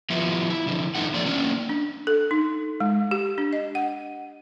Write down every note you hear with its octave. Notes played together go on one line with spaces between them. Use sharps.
F3 G3 B3 E4 F4
E4
D3 F3
E2 E3 A3 D#4 F#5
F3 A#3 A4 D5
A#3 C#4 D4
D4
A4
D#4
G#3
G4
D4
D#5
F#5